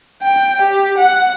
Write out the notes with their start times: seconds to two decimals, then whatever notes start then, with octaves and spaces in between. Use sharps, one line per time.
0.22 G5
0.62 G4
0.98 F#5